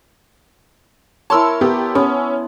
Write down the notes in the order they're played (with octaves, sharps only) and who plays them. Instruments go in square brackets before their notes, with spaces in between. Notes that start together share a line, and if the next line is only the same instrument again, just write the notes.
[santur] E4 A#4 C#5 [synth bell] A5 C6 E6
[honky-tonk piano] B3 G4
[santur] B3 [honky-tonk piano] C#4